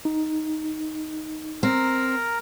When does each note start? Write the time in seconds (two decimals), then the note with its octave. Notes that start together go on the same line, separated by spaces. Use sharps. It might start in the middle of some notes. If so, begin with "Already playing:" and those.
0.05 D#4
1.63 C4 A#4 A#5